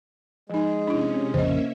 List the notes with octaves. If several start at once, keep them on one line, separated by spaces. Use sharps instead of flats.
F3 G#3 D#4 G#4
C3 C#4 D4 E4
A#1 F2 C#3 A#3 C#4 C5 D#5 E5